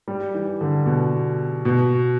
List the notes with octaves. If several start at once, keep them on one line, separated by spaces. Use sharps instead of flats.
G3
E3
D3
B2
B2